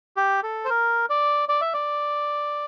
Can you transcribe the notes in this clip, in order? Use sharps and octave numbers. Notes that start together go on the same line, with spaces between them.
G4
A4
C5
A#4
D5
D5
E5
D5